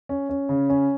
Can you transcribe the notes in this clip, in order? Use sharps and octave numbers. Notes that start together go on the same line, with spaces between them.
C#4
C#4
C#3
C#4